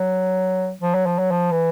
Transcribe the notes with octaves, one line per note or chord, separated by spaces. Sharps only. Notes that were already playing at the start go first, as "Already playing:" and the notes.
Already playing: F#3
F3
F#3
F3
F#3
F3
E3